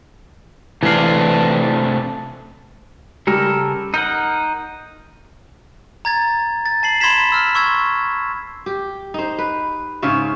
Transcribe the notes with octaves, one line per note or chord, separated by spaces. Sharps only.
C3 E3 A3 D4 F5
C#3 G3 A4 A#4
D#4 A#4 F#5 G6
A#5 G#6 A6
A6
A5 C7 F#7
B5 C6 G#6 A6 B6 E7
E6 F6
C6 C#6 E6 G#6
G4
D#4 C5
B4
G#2 C#3 C#4 E5